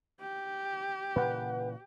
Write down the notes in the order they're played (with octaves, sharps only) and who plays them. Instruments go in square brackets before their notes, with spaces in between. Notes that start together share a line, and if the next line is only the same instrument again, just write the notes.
[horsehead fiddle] G4
[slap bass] A#2 C#3 E3 [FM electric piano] B4 F#5